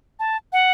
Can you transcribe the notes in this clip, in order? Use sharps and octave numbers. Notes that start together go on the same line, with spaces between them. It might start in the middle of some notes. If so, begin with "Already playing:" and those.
A5
F#5